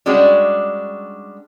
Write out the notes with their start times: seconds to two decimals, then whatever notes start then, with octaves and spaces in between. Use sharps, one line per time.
0.06 G3 G#3 C#4 D4 F#4 G4